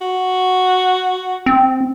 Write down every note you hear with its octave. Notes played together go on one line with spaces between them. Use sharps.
F#4
C4